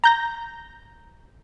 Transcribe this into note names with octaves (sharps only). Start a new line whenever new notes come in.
A#5 G6 A#6